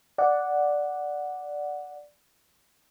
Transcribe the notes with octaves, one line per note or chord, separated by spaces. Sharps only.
D5 F#5